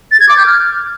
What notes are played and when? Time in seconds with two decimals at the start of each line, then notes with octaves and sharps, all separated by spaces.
0.11 A6
0.20 G#6
0.29 D6
0.37 G6
0.46 F6